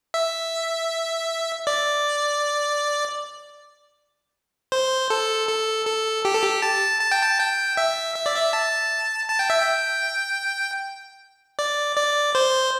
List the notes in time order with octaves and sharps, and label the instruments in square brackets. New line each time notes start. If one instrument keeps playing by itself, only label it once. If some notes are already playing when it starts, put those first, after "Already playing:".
[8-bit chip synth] E5
D5
C5
A4
A4
A4
G4
A4
G4
A5
A5
G5
A5
G5
E5
E5
D5
E5
A5
A5
G5
E5
G5
D5
D5
C5